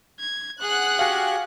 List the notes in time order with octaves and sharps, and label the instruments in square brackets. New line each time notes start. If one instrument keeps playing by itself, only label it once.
[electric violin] G#6
[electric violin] G#4 [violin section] F#5 F#6
[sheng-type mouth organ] F#4 G4 [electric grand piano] F5 G#5